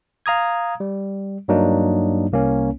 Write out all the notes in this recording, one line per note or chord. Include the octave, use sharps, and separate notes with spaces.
F5 A#5 D#6 G#6
G3
G2 F#3 A#3 D4 D#4
C2 A#3 C#4